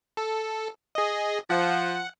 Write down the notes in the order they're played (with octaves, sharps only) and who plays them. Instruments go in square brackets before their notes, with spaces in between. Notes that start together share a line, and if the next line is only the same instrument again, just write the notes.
[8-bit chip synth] A4
G#4 D#5
[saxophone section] F3 [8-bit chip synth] F#5